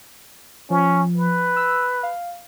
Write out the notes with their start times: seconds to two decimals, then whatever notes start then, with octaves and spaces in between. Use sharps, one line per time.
0.70 F3 C#4
1.16 B4
1.56 E6
2.03 F5